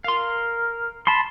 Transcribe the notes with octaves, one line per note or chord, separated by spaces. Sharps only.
A#4 F5 C6
A5 B5 C6